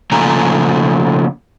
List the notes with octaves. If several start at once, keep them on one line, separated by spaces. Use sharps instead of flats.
C#3 F3 A3 A#3 G#5 A#5